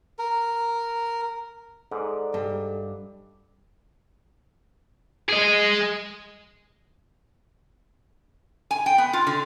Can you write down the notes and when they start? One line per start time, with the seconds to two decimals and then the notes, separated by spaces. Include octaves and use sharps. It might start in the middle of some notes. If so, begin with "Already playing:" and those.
0.19 A#4
1.91 G#2 A4 D5
2.34 G2 A4
5.29 G#4 D#5
8.71 G#5
8.86 G5
8.98 B3
9.13 F4
9.27 D3